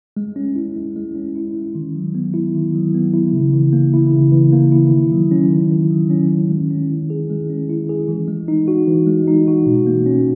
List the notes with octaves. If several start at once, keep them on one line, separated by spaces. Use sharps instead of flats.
G#3
C#4
E4
G#3
G#3
C#4
E4
G#3
D#3
F#3
B3
E4
D#3
F#3
B3
E4
C#3
E3
A#3
E4
C#3
E3
A#3
E4
D#3
F#3
C#4
D#3
D#3
F#3
C#4
D#3
G#3
C#4
E4
G#4
G#3
C#4
E4
G#4
E3
G#3
D#4
F#4
E3
G#3
D#4
F#4
B2
A#3
C#4